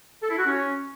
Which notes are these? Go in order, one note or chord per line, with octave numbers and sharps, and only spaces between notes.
A4
E4
F#4
C#4